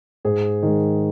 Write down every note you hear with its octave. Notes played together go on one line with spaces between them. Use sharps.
G#2 G#4
D#3 G#3